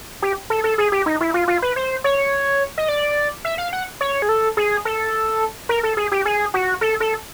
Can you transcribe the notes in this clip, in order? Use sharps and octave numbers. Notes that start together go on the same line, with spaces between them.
G4
A4
A4
G#4
G4
D#4
E4
F4
F4
B4
C5
C#5
D#5
D5
E5
F5
F#5
C#5
G#4
A4
G#4
A4
A#4
A4
G#4
G4
G#4
F#4
A4
A4